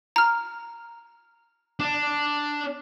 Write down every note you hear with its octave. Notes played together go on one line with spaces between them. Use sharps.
A#5 F6
D4